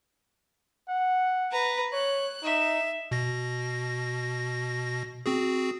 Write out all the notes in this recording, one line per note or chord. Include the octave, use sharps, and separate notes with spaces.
F#5
B4 A#5
C#5 F#6
D#4 E5
B2 A#6
C4 F#4 G#4